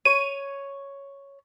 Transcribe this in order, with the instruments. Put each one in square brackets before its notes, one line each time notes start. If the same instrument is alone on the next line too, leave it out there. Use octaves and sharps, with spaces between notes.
[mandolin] C#5 [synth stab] D#7